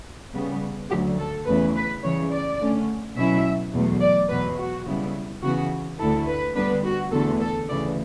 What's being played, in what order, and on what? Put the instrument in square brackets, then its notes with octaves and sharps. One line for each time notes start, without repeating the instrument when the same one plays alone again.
[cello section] C#3 G3 B3
D2 D3 F#3 G4
A4
E2 C#3 E3 A3 B4
B4
C#3 E3 G3 C#5
D5
D3 A3 C#4
B2 F#3 C#4 E4 E5
E2 B2 F#3 A3
D5
E2 B2 F#3 B4
F#4
C#3 G3 B3 E4
C#3 E3 B3 F#4
D2 D3 A3 E4 A4
B4
D3 G3 B3 D4 B4
F#4
E2 D3 A3 A4
A4
D2 C#3 E3 D5